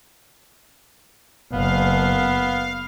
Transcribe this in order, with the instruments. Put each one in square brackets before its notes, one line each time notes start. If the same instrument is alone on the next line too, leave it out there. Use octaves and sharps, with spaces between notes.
[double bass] F#1 [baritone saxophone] B3 [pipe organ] F5